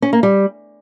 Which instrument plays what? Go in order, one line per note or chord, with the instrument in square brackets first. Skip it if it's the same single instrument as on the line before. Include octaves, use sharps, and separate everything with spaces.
[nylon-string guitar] C#4
A#3
G3